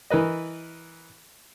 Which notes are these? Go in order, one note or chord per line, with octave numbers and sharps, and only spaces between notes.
E3 A#4 B4 D#5